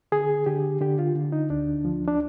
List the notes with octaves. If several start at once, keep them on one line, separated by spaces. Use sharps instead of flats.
D3 G#4
D3 G4
D3 G4
F4
D3
D#4
D2 D4
F3
D4